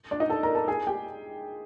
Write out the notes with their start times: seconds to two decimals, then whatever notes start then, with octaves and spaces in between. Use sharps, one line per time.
0.11 D4 D5
0.20 D#4 D#5
0.29 A4 A5
0.43 A#4 A#5
0.55 A4 A5
0.68 G#4 G#5
0.87 G4 G5